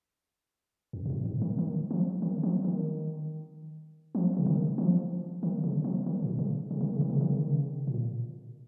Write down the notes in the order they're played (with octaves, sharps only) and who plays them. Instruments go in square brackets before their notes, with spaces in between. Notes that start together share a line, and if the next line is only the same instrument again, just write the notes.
[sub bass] F2
A#2
G#2
G#2
D#3
D#3
F3
D#3
F3
D#3
F3
C#3
D#3
F3
D#3
C#3
F3
D#3
A#2
C#3
C#3
D#3
C#3
D#3
C#3
D#3
C#3
D#3
C#3
A#2